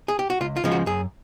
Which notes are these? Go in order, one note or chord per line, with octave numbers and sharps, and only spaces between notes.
G#4
G4
F#4
C#2 F4
F4
C#3 F3 G#3
F#4
F#2 G#4